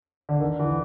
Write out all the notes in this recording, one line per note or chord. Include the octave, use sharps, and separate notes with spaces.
D3
D#3
D3 E3